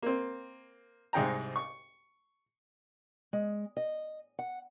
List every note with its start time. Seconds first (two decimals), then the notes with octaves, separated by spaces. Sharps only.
0.03 A#3 C4
1.13 C2 G#2 G#3 G5 A#5
1.56 C#6
3.33 G#3
3.77 D#5
4.39 F#5